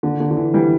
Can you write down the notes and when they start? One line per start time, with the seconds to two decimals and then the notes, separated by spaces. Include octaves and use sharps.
0.03 D3
0.20 D3
0.31 D3
0.37 E3
0.54 E3 G3